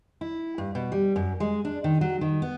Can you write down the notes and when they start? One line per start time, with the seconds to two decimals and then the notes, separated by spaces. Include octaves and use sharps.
0.21 E4
0.58 G2
0.75 B2
0.92 G3
1.16 F#2
1.40 G#3
1.65 D4
1.84 D#3
2.01 F#3
2.21 D#3
2.42 B3